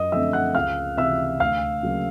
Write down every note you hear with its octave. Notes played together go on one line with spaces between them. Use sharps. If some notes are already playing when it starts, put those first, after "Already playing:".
Already playing: F#2 D#5 D#6
D3 F3 A3 C4 E5 E6
F#5 F#6
C#2 F5 F6
C3 E3 E5 E6
D2 F5 F6
C#3 F#3 A#3